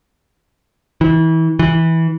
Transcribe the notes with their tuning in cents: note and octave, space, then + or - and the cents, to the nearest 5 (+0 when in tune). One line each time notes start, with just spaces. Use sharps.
E3 -30
E3 -15